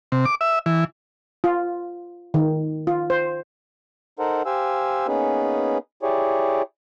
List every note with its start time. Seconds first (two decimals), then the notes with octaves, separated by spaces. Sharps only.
0.12 C3
0.25 D6
0.41 E5
0.66 E3
1.44 F4
2.34 D#3
2.87 F4
3.10 C5
4.19 D#4 A4 A#4 C5 F#5
4.46 G4 C5 F5 G#5 E6
5.08 A#3 B3 C#4 D#4 G#4 B4
6.03 E4 G4 G#4 C#5 D5